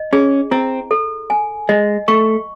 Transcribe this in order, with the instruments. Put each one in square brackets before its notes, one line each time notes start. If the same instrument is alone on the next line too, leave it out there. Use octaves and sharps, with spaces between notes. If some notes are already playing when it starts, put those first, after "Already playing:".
Already playing: [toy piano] D#5
[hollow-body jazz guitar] C#4 [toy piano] G#4
[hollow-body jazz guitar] C4 [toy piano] E4
[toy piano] A4
G#5
[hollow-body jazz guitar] G#3 [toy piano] D#5
[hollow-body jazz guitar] A3 [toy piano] C#6